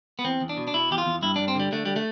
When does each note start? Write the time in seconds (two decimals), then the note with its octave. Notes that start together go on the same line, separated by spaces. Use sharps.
0.19 B3
0.25 E2 C4
0.41 E2
0.49 D4
0.57 B2
0.67 D4
0.74 B2 E4
0.91 E2 G4
0.98 F4
1.06 E2
1.22 G2 E4
1.36 G2 D4
1.48 C4
1.55 D3 G3
1.72 D3 A3
1.85 G3
1.96 A3